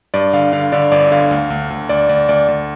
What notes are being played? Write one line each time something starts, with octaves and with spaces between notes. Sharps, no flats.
G2 D5
D3 F5
D3 F5
D3 D5
G1 D5
D3 F5
D2
D2
D2
D2 D5
D2 D5
D2 D5
D2